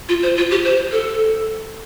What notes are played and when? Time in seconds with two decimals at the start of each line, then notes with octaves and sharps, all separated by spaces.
0.09 F4
0.23 C5
0.37 F4
0.51 G4
0.65 C5
0.92 A4